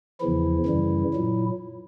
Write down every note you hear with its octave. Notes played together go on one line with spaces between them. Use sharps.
E2 C#3 E3 F3 E4
F#2 C#3 E3 G3
A#2 F#3